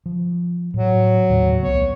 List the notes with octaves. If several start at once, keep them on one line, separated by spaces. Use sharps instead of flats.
F3
A2 F#3
D#2 A2 C#3
C2 A3 B3 C#5